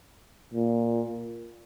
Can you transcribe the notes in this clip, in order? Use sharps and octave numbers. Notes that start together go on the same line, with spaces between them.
A#2